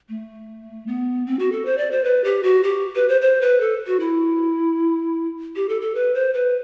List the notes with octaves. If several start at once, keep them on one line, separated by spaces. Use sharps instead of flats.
A3
B3
C4
F#4
A4
C5
D5
C5
B4
G4
F#4
G4
B4
C5
C5
B4
A4
F#4
E4
G4
A4
A4
B4
C5
B4